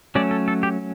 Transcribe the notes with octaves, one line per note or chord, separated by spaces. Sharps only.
F#3 A3 C#4 D5
A4
A4
G4